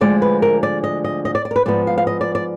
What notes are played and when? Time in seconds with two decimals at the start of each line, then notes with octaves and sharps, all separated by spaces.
0.01 D2 D3 F3 G#3 D5
0.22 B4
0.42 A#4
0.63 D5
0.84 D#5
1.04 D#5
1.25 D#5
1.35 D5
1.45 D5
1.51 A#4
1.56 B4
1.66 G#2 F3 B3 D5
1.87 F5
1.98 F5
2.07 D#5
2.21 D5
2.35 D5